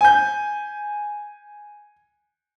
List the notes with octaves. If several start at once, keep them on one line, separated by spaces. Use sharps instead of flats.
G#5 G6